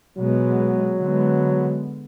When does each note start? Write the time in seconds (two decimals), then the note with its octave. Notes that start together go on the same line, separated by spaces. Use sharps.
0.16 B2 F#3 G#3 B3
0.98 D3 G#3 B3